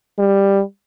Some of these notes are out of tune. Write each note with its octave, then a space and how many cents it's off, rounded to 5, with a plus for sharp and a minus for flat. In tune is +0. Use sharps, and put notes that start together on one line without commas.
G3 +10